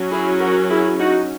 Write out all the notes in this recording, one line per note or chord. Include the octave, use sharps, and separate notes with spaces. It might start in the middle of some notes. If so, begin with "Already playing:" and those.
Already playing: F#3 C#4
E4 G#4
F#4 A#4
E4 G#4
D#4 F#4